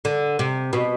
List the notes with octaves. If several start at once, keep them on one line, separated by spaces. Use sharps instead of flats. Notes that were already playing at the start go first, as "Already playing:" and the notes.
D3
C3
B2